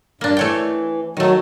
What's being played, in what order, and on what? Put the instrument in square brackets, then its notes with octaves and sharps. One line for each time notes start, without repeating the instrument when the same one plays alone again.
[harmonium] G2 [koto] A#3 D4
[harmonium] E3 [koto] A3 C#5 G5
[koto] D#3 A3 [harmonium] F#3